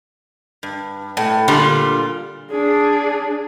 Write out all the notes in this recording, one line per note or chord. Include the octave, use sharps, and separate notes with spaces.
G2
A2
A#2 D3 G3 F4
D4 G#4